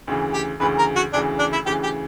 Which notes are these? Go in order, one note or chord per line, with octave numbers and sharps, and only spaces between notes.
D2 C#3 E3
G4
D2 C#3 E3 B4
A#4
F#4
D2 C#3 E3 D4
D4
E4
D2 C#3 E3 G4
G4